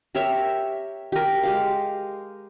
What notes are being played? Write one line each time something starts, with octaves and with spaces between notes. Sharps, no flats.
G4 A#4 C#5 E5
G4 A#4
G#3 G4 F5